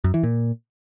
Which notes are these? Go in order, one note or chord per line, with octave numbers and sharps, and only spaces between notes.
F#2
E3
A#2